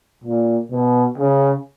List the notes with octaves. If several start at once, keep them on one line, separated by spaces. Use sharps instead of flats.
A#2
B2
C#3